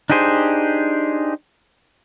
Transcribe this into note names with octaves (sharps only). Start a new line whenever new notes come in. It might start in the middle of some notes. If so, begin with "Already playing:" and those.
D4 D#4 G4 G#4 C5